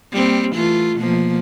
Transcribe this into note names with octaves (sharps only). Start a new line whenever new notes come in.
G3 A#3 C4
E3 A3 F4
B2 F3 A#3